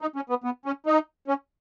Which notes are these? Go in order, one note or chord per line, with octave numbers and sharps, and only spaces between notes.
D#4
C#4
B3
B3
C#4
D#4
C#4